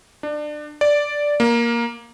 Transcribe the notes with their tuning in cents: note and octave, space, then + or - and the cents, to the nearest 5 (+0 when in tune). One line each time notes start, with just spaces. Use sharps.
D4 +25
D5 -5
A#3 +10